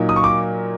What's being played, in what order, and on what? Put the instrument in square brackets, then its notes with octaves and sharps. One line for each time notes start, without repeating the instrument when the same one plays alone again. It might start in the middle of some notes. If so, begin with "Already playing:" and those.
Already playing: [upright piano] A#2 F#3 A#3 D#4
[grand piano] D#6
C#6
D6